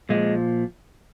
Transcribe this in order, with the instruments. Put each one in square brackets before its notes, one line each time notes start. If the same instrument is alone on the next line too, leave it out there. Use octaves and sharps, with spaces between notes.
[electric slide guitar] A#2 F3 G#3